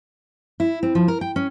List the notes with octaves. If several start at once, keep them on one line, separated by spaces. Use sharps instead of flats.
E4
C4
F3
A#4
G5
C#4